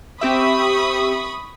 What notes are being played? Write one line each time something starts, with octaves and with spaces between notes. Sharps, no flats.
C4 G4 E5 B5 C#6 D#6